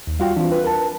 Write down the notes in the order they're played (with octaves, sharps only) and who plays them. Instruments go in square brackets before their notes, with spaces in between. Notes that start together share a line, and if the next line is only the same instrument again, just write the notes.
[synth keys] D#2
[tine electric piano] G3 F4 G5 [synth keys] F#4 F5
[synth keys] E3 C4 [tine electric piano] D4 F4
[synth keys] B4
[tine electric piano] A#4 A5